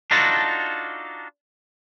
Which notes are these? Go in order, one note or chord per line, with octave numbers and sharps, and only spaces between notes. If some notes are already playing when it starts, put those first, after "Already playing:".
D4 D#4 F4 F#4 A4